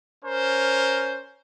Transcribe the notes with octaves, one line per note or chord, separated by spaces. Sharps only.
C#4 A#4 C5